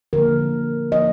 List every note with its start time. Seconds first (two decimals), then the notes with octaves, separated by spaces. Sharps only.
0.13 D3 F3 A#3 A#4
0.92 D3 F3 A#3 D#5